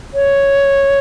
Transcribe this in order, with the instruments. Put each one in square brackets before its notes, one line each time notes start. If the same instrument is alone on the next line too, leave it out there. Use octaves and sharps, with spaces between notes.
[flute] C#5